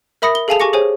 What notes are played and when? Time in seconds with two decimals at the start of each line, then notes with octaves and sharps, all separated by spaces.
0.22 A#4 E5 B5 D#6 A#6 C#7
0.35 G7
0.48 G#4 A4 F5 G#5 A5 F7
0.60 G4 G#5 C#6 D6 A#6 C#7
0.73 G#4 C5 C#5 G#5